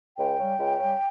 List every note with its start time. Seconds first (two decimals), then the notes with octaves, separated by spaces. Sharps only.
0.17 C#2 G5
0.38 C#3 G3
0.58 C#2
0.78 C#3 G3